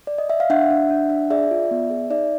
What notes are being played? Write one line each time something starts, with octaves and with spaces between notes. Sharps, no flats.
D5
D#5
E5
F5
D4 E5 F#5
D4
D4
D4
G#4 D5 E5
F4
B3
G#4
D#4 D5 E5